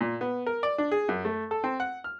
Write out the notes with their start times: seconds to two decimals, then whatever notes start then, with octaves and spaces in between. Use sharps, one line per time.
0.01 A#2
0.21 B3
0.46 A#4
0.63 D5
0.78 D4
0.91 G#4
1.09 F#2
1.25 A3
1.51 A4
1.64 C4
1.80 F#5
2.04 F6